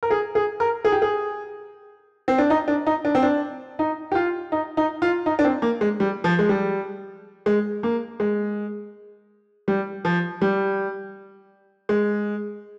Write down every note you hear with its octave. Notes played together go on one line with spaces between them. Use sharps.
A#4
G#4
G#4
A#4
G#4
G4
G#4
C4
D4
D#4
D4
D#4
D4
C4
D4
D#4
G4
F4
D#4
D#4
F4
D#4
D4
C4
A#3
G#3
G3
F3
G#3
G3
G#3
A#3
G#3
G3
F3
G3
G#3